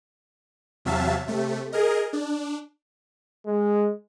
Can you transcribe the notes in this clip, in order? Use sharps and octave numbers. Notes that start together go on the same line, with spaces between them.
E2 C3 F#3 E5 F5 A5
C3 A3
G#4 A#4 D#5
D4
G#3